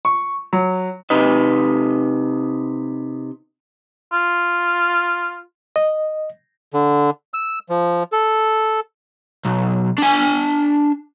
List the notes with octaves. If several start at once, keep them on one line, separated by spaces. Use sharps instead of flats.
C#6
F#3
C3 D#4 B4 D#5
F4
D#5
D3
E6
F3
A4
B1
D4 G#5